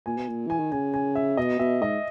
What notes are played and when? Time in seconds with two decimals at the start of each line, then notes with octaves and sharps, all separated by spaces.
0.06 A#2 G#5
0.17 B2
0.28 A#2
0.47 E3 G#5
0.59 D#3
0.72 C#3 G#5
0.94 G#5
1.15 E5
1.37 B2 D#5
1.59 B2 E5
1.82 G#2 D#5